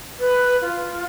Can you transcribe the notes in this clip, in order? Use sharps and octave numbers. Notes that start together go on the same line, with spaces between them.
B4
F4